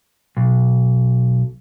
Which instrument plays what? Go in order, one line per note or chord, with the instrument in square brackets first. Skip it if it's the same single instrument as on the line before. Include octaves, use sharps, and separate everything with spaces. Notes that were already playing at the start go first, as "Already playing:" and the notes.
[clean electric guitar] B1